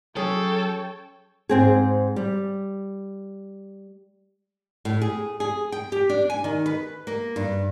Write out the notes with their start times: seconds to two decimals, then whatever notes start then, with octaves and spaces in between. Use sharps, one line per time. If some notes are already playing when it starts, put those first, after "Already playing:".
0.16 F#3 C#4 G#4 A4 C#5 G5
1.49 G#2 C4 G#4
2.16 G3
4.85 A2
5.01 G#4
5.40 G#4
5.72 G5
5.92 G4
6.09 D4
6.30 G#5
6.44 D#3
6.66 B4
7.07 A#3
7.36 G2